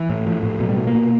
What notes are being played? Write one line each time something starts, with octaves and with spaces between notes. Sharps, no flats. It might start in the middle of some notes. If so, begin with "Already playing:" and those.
Already playing: E3
A2
A2 F3
A2
B2 F#3
G3
B2 A3
A#3
B2